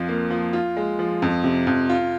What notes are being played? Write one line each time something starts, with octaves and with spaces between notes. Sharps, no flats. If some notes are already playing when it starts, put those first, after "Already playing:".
Already playing: F2 F3
A#3
F3
F4
G#3
F3
F2
C3
F2
F4